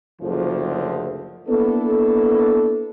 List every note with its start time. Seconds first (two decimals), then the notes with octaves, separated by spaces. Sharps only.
0.22 F#1 D2 F3
1.49 A#3 B3 D4 E4 A4